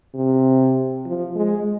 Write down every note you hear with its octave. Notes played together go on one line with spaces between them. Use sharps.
C3
F3
G#3